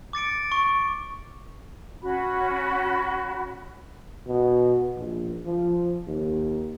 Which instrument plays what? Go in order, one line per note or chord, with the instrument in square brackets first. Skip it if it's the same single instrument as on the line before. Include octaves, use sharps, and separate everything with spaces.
[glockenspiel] D6 A6 C#7 D7
C#6
[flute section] C#4 F#4 B5
[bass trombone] B2
A#1
F3
D#2